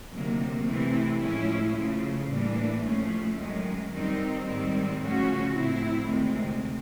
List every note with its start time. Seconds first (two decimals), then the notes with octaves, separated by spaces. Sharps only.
0.11 D2 C3 D#3 F#3 A#3
0.66 C3 E3 A3 C4 E4
1.20 A2 F3 G#3 C#4 E4
1.75 C#3 F3 A3
2.29 A2 E3 G3 A#3 D4
2.83 A2 F3 A3 C#4
3.37 F#2 D#3 G#3
3.91 D#3 G3 C4 D#4
4.45 G#2 D#3 G3 C4
5.00 C#3 F3 A3 C#4 F#4
5.55 A2 F3 A3 C4 E4
6.09 D2 C3 D#3 G#3 C4